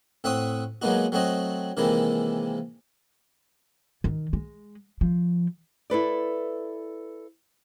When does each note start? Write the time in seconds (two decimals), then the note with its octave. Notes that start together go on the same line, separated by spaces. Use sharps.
0.24 A2 C4 E5 F#5 C#6 D#6
0.82 F#3 G#3 A#3 B3 D#4 F#4
1.12 F#3 A3 C4 F#4 D#5
1.77 C3 D#3 E3 G#3 A#3 E4
4.04 D#3
4.33 G#3
5.01 F3
5.90 E4 A4 B4 D5